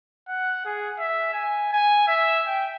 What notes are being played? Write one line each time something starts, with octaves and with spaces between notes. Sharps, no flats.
F#5
G#4
E5
G#5
G#5
E5
G5